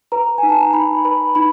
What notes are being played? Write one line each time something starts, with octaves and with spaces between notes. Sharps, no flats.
B4 A#5
D#4 G#5
A5
A#5
D#4 B5
B4 B5
D#4 B5